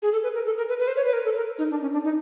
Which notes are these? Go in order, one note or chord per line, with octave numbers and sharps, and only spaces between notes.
G#4
A4
B4
A#4
A4
A#4
B4
B4
C5
C#5
B4
A#4
A4
A#4
D#4
D4
C#4
D4
D#4